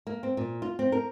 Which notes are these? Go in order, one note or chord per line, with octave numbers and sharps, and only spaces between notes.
A#3
C4
A#2
F4
C4
A#4